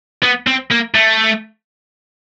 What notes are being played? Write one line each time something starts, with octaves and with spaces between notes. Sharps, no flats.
B3
C4
A#3
A3